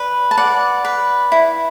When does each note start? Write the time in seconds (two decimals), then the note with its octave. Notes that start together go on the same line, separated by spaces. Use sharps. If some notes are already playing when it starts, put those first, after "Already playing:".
Already playing: B4 D5
0.31 A5
0.37 D5 F#5
0.85 B4
1.32 E4